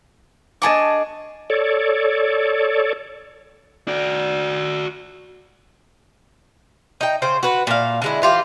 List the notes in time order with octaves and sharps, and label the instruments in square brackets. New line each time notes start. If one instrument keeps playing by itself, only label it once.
[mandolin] D4 G#4 C#6 [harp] D#5 A5 D6
[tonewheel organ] A4 C#5 D5
[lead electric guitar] F#4 D5
[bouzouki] D#4 G5
C#3 C5 G5
F#4 B4
A#2 F5
D3 G#3 E4
E3 F4 G4